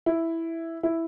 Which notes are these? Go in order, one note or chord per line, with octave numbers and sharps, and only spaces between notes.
E4
E4